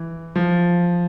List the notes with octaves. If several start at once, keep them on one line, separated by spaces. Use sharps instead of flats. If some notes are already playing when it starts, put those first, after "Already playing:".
Already playing: E3
F3